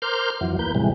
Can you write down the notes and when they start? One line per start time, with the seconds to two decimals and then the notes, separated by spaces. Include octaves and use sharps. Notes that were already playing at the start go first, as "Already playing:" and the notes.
0.02 A#4 C5 C6 D6 F6 G6
0.41 F2 E3 F#3
0.59 E2 A#3 B4 G6
0.75 A2 C3 E3 G3 G#3